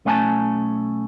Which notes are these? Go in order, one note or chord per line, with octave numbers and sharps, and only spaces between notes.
B1 A3 C#4 F5 G#5 A5